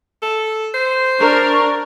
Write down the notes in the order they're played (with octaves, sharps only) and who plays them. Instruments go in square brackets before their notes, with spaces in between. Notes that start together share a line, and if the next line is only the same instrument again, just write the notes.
[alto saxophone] A4
C5
[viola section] D4 A#4 [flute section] D5 A#5 C#6